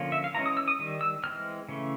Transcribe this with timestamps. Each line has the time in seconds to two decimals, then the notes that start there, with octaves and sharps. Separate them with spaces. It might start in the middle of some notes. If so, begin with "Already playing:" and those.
Already playing: D3 F3 A#3 C#4
0.12 E5
0.24 F5
0.34 E3 G#3 C#4 A#5
0.46 D#6
0.57 E6
0.68 D#6
0.79 D#3 G3
1.01 E6
1.23 E3 G#3 C4 F6
1.69 C#3 E3 A3